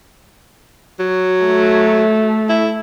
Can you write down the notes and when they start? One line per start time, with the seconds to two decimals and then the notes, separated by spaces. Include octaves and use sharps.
1.00 F#3
1.44 A3
2.49 E4